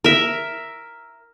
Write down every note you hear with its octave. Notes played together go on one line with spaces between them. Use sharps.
A#4 E5